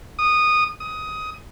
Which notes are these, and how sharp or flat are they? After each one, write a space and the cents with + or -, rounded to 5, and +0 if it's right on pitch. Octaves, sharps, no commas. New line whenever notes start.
D#6 -15
D#6 +15